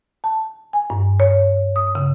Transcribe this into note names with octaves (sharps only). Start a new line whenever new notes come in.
A5
G#5
G2
C#5
D#6
C#3